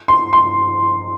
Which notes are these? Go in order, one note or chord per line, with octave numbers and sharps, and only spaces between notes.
C6
C6